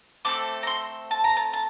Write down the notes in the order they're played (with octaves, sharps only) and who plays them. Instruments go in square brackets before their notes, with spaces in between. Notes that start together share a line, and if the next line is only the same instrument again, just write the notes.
[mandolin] A3 C4 A4 D6
A#5
C6
A5
A#5
A5
A5